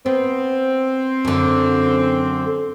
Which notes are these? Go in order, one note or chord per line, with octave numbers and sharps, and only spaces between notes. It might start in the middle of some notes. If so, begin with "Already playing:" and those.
B3 C4
F#2 D3